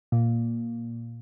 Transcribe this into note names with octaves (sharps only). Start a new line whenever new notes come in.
A#2